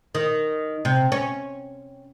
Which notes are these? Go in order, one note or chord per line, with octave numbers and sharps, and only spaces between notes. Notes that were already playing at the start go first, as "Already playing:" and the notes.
D#3
C3
C#4